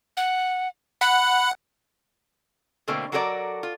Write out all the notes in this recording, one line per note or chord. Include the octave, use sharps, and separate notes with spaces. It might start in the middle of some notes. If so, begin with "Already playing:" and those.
F#5
F#5 B5
B2 D3 A3 A#3 C4
F#3 F#4 A4 A#4 C5 D5
F4